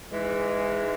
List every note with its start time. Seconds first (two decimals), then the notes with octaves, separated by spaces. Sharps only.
0.11 G#2 E3 G#3